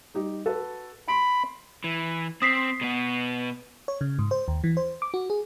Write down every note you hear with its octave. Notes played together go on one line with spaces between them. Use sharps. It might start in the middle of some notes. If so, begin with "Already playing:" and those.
G3 D#4 G4
F#4 A4 B4
B5 C6 D7
E3
C4 D#6 B6 C7
B2 B3
C#5
C#3
G#2
C5
D#2
E3
C5
D6
F#4
G#4